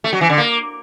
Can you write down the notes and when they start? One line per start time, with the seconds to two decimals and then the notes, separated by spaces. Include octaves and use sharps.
0.04 A3
0.13 F#3
0.21 E3
0.29 D3
0.38 A#3